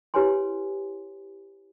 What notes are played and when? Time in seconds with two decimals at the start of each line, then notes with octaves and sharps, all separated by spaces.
0.14 E4 G4 B4 C#5 G#5 C6